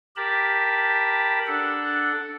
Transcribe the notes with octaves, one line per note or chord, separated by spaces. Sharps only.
G4 A#4 A5 B5
D4 A4 F#5